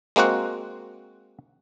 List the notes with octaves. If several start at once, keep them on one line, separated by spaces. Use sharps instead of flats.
G#3 A#3 C4 F#4 F#5